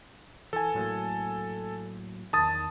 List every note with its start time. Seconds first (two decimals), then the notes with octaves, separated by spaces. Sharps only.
0.53 E3 A4 G#5
0.74 A2 F#3 A#3
2.33 E2 D#3 A5 D#6 A6